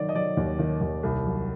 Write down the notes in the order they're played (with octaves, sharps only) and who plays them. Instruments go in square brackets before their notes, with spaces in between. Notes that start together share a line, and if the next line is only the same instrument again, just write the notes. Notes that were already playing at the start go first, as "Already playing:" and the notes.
Already playing: [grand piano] D#3 F#3 D5
D#5
F#3 D5
D#2
D#3
D#2
C2
F#3